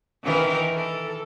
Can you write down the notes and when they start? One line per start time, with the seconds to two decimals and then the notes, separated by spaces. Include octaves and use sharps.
0.24 D#3 E3 A#4
0.74 A4